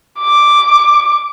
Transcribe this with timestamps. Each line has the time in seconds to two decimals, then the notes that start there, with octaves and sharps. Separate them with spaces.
0.19 D6